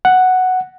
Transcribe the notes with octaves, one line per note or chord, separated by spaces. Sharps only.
F#5